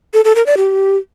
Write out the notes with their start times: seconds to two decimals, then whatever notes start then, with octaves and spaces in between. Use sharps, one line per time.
0.14 A4
0.25 A4
0.35 A#4
0.46 D5
0.57 G4